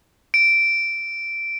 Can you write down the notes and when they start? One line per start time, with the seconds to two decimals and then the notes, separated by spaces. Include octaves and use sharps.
0.34 D7